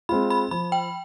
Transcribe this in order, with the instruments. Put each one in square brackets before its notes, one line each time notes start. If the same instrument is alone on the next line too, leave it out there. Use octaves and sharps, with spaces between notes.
[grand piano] G#3 C4 F4 [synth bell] B5
[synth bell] B5
[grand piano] F3 [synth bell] B5
[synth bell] G5